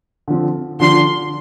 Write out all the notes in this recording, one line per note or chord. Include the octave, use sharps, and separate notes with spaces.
D3 F3 C4
D3 F3 D4 C6